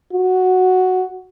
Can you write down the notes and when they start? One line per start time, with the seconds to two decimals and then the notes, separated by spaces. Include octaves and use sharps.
0.13 F#4